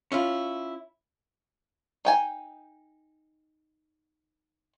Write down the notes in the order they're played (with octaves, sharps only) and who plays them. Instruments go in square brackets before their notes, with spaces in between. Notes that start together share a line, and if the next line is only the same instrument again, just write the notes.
[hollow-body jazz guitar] C#4 E4 F4
[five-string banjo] D#4 G5 G#5